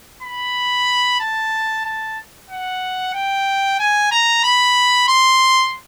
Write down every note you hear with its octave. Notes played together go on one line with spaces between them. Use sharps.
B5
A5
A5
F#5
G5
G#5
A#5
B5
C6